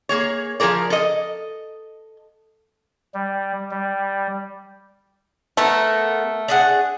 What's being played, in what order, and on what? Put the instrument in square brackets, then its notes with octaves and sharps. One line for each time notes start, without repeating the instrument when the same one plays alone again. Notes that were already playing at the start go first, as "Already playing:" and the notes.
[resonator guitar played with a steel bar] A#3 G#4 C#5
F3 G3 G#4 A#4 D5
A4 D#5
[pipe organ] G3
G3
[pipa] A3 [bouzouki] B3 A4 A#4
[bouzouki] D4 G#4 F#5